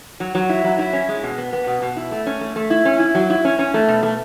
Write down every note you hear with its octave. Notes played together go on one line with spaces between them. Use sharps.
F#3
F#3
E4
F#3
E4
C#4
G#3
B2
B3
B3
B2
B2
E4
A3
C#4
A3
A3
E4
C#4
E4
F#3
E4
C#4
C#4
A3
B2
A3